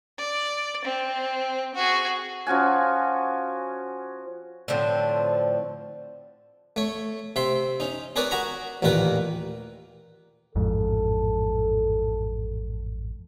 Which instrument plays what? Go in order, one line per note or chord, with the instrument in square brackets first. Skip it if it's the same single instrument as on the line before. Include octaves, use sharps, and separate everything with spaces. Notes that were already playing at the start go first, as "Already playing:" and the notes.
[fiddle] D5
C4
F#4 G#4
[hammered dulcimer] F3 C#4 F#4 G#5
[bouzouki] A2 D3 F3 C4
[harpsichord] A3 C#5
C3 E5 C6
C#4 D#4
G#4 A#4 B4 C#5 D5 G#5
F#4 G#4 A#5 B5 C#6
A1 D#2 A#2 D#3 A#4 B4
[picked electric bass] A1 F2 G#2 [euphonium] A4